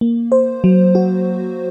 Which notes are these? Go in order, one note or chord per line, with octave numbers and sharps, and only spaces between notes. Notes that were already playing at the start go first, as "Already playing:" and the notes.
A#3
C5
F#3
F#4